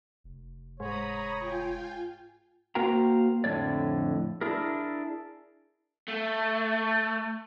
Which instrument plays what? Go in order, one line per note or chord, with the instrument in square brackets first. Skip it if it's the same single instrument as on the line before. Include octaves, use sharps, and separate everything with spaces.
[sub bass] F1
[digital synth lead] G#2 [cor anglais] C#5 [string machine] A#5 B5 D#6
[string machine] F4 G5 G#5
[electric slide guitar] A#3 F#4 A#4 C5 G5 A#5
F2 A2 D3 G#3 C#5 D5
D4 E4 G#4 A#4
[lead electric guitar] A3